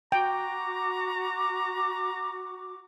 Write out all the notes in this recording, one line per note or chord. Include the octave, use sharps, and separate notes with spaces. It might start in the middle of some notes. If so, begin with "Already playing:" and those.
F#4 G5 A#5 D6